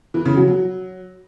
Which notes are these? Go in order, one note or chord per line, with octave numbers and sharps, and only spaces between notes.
E3
C#3
F#3
F#3